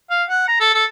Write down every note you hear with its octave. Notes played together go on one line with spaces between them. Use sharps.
F5
F#5
A#5
A4
A4